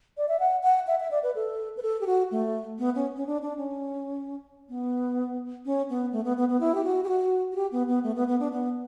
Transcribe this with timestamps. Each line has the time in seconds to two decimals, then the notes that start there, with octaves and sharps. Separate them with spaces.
0.17 D5
0.29 E5
0.40 F#5
0.63 F#5
0.87 E5
1.00 E5
1.11 D5
1.23 B4
1.35 A4
1.77 B4
1.82 A4
2.01 G4
2.07 F#4
2.31 A3
2.79 B3
2.95 C#4
3.16 C#4
3.27 D4
3.42 D4
3.58 C#4
4.69 B3
5.66 C#4
5.89 B3
6.12 A3
6.24 B3
6.37 B3
6.49 B3
6.60 E4
6.75 G4
6.84 F#4
7.04 G4
7.09 F#4
7.52 F#4
7.56 G4
7.72 B3
7.88 B3
8.03 A3
8.16 B3
8.28 B3
8.40 D4
8.52 B3